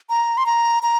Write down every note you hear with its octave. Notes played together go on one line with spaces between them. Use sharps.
A#5
C6
A#5
A#5